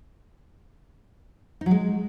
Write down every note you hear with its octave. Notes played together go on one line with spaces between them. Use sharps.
D#4
F#3
G#3